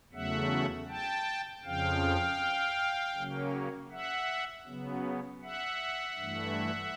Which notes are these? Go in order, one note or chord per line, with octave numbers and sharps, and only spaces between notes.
E2 C#3 F#3 A3 E5 F#5
G5 A5
F2 C#3 F3 F5 G5
C#3 F#3 A#3 C#4
E5 F#5
C#3 F#3 B3
E5 F#5
G2 E3 A3